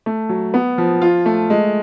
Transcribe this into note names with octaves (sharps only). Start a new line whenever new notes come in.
A3
F#3
B3
F3
F4
A3
G#3